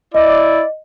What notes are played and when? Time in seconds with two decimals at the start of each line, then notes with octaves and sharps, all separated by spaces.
0.15 E4 D5 D#5